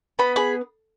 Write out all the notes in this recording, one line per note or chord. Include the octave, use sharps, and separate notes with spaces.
B3 B5
G#4 B5